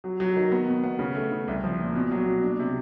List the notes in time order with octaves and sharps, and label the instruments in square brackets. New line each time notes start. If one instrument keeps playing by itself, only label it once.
[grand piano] F#3
F#3
D#3
B3
B2
B3
C#3
A3
C#3
C2
F3
A#2
B2
F#3
B2
D4
C3